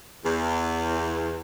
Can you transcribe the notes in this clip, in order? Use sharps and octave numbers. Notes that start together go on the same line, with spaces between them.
E2